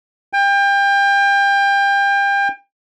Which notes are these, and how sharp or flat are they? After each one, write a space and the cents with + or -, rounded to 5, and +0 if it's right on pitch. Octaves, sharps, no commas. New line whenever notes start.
G5 +30